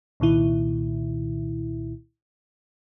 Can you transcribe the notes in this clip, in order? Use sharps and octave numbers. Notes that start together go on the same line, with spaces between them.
C2 A#2 D#3 E4